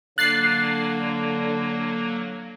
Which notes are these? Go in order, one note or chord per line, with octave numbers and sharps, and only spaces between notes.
D3 F#3 A#3 F#6 A6 C7